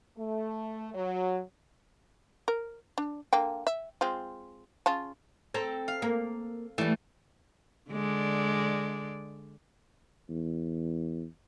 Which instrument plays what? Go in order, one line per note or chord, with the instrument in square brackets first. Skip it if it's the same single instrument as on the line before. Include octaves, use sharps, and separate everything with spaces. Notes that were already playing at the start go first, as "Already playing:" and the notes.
[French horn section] A3
F#3
[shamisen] A#4
D4
D3 A#3 G5
E5
G#3 C4 F4
C#3 F4 A5
[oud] C4 [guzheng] A4 A#5
[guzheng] F5
[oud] A#3
[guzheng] E3 [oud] G3 A3
[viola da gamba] D3 G#3 D5
[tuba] E2